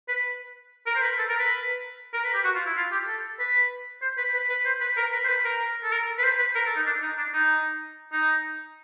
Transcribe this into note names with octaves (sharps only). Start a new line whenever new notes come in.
B4
A#4
C5
B4
A4
A#4
B4
A#4
B4
G4
F#4
F4
E4
F4
G4
A4
B4
C5
B4
B4
B4
C5
B4
A#4
B4
C5
B4
A#4
A4
A#4
B4
C5
B4
A#4
A4
D#4
D4
D#4
D4
D#4
D#4